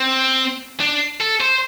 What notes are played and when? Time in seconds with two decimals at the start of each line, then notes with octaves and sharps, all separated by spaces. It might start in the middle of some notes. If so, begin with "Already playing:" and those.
Already playing: C4
0.80 D4
1.20 A4
1.40 C5